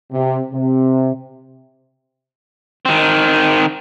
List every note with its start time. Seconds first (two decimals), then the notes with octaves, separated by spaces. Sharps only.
0.12 C3
0.52 C3
2.85 D#3 C4